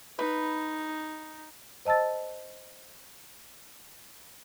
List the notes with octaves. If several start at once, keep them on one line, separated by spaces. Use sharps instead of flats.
D#4 B4
C5 D#5 A5 E6 A6